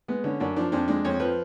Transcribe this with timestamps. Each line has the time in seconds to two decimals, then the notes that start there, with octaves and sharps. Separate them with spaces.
0.08 G#3 B3
0.24 D3 C#4
0.40 F#2 D4
0.56 F3 D4
0.72 F2 D4
0.88 G#3 D4
1.05 F2 C#5
1.20 F3 B4